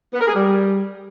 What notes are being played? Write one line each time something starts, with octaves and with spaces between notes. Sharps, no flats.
B3
A#4
G#4
G3